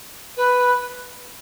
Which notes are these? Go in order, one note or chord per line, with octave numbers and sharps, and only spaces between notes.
B4